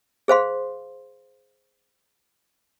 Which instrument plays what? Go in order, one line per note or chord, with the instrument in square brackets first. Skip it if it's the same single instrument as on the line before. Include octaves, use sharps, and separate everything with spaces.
[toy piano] G#4 C5 F5 C6